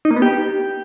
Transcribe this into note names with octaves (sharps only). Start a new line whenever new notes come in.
D#4
A#3
B3
G4